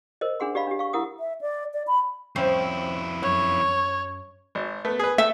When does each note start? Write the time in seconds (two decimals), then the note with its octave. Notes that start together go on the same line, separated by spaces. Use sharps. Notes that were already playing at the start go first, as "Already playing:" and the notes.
0.21 A#4 C5 D#5
0.40 D4 G#4 F#5 C6
0.55 G4 D5 F5 B5
0.67 D4 G4
0.79 F5 C#6
0.93 E4 A#4 F#5 D#6
1.20 E5
1.41 D5
1.74 D5
1.87 B5
2.36 F2 C4 C#4 E4 F5
3.23 F#2 C#5
4.55 G#1
4.85 A3 B3
4.99 G#4 B4
5.18 A3 E5